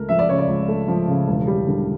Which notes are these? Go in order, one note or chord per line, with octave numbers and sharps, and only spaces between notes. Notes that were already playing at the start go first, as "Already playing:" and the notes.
Already playing: C#2 A3 A#4
F3 E5
D5
C#3 C#5
D5
C#2
A3
F3
C#3
E1
G3
D3